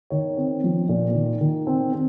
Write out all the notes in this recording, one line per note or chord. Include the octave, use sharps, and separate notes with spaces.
D#3 C#5
C4
F3
A#2
D#3
D#3
C4
C4